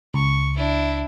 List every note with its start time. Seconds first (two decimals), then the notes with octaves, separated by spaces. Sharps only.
0.14 C#2 C#6
0.56 D4 E4